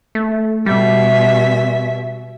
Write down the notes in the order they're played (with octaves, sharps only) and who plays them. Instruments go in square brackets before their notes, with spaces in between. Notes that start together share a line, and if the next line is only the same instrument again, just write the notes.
[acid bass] A3
[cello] B2 E5 [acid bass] G3